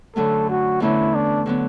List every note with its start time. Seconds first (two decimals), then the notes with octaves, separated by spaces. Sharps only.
0.16 F#2 D3 F#3 A3 A4
0.49 F#4
0.80 E2 D3 A3 C#4 E4
1.15 D4
1.46 D3 F#3 B3